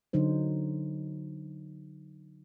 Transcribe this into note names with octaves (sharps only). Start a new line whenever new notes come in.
D3 F#3 D#4 C5